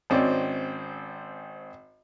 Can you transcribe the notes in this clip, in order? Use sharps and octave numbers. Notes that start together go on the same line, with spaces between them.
G#1 C4 C#4 D5